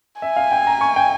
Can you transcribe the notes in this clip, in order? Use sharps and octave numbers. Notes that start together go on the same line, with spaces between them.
E5 G#5
F5
G5
A#5
C#6
G5